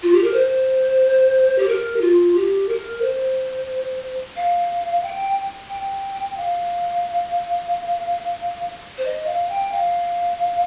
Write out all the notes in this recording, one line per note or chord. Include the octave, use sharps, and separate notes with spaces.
F4
G4
A#4
C5
G4
A#4
G4
F4
G4
A#4
C5
F5
G5
G5
F5
C5
D#5
F5
G5
F5